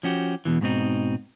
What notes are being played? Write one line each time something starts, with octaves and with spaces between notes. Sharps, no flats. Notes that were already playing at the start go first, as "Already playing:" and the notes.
F3 C#4 F#4 G4
E2 G2 B2 E3
G#2 B2 C4 D#4